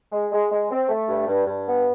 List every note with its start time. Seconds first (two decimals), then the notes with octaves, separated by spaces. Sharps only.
0.12 G#3
0.32 G#3
0.51 G#3
0.71 C4
0.89 A3
1.08 G2
1.27 G2
1.47 G2
1.67 B3